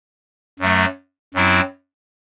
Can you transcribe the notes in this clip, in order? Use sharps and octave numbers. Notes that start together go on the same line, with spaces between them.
F#2 F#3 A3
F#2 F#3 C4 E4